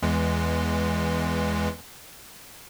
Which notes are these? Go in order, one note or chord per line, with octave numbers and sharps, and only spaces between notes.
E2 E3 G#3